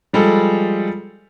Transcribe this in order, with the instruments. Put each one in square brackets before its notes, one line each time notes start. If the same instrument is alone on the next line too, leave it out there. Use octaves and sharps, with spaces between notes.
[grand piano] F3 G3 G#3 A4